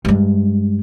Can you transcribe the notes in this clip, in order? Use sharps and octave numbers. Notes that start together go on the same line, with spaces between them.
G2 G#3